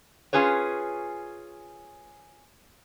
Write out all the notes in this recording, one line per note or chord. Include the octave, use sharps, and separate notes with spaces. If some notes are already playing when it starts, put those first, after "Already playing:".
C#4 F4 G#4 B4 C#5